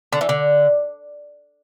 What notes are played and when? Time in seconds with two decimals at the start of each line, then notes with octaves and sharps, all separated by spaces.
0.12 D3
0.21 E3
0.29 D3